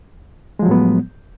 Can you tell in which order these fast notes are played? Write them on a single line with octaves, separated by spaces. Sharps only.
G#3 F3 F#3 A2 B3